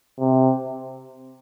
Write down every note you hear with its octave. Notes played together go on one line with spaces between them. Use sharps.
C3